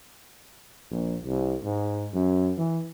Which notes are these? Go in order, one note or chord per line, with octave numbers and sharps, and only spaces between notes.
A#1
C2
G#2
F#2
E3